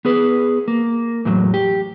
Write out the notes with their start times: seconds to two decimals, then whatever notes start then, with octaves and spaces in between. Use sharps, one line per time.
0.05 B3 G#4 B4
0.68 A#3
1.25 E2 A2 F#3
1.54 G4